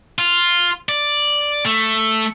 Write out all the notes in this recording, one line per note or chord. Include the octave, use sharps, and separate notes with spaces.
F4
D5
A3